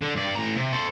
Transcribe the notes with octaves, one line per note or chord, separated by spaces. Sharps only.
D3
G2 D5
A2 A#5
C3
A4 C5